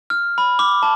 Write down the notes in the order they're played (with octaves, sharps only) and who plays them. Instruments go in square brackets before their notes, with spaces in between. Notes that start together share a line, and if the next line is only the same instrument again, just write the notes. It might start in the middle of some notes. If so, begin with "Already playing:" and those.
[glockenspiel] F6
B5
D6
A5